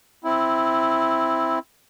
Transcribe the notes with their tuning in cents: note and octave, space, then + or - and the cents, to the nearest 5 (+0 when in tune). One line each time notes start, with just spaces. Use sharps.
C4 +0 E4 +0